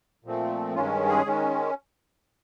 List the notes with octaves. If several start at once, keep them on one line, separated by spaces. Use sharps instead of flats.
A#2 F3 A3 C4
G2 D#3 G#3 C#4 F4
G#4
D#3 G#3 C#4